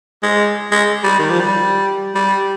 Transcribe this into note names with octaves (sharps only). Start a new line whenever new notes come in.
G#3
G#3
G3
D#3
F3
G3
G3